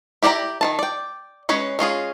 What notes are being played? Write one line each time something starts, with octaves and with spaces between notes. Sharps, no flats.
E4 G4 D5 G5 A#5
D#3 F4 A5
D5 G5
G#3 C#4 B4 C#5
G#3 C#4 F4 G#4